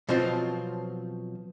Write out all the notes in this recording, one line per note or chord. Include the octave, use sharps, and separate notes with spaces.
B2 F3 F#3 C4 F4